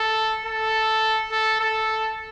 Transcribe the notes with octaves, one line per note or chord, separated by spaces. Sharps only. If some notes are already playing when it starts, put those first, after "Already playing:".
Already playing: A4
A4
A4
A4